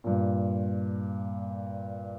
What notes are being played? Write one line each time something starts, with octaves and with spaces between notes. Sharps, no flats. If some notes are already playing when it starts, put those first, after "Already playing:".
G2 A#2